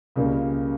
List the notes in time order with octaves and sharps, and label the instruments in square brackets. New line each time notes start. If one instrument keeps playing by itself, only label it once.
[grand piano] C#2 C#3 G3 A#3